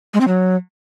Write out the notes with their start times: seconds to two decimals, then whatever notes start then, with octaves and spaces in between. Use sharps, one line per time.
0.14 G#3
0.21 C4
0.27 F#3